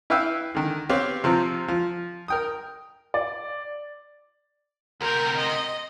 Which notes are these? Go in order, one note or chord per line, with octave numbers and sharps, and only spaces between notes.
E4 B4 E5 F5 G5 E6
D3 D#3
B3 C4 G4 C#5 F5
C3 F3 C4
F3
A#4 G5 D#6
D5
D2 C3 A#4 G5
D#5